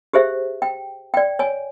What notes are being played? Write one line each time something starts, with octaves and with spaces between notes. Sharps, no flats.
G4 G#4 C5 E5
G5
D5 G5
C#5 G#5